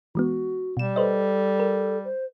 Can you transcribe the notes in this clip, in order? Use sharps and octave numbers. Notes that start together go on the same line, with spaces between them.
E3 G#3 B3 F#4
B2 G3 E7
A4 B4 C5 D#5
A#4
C5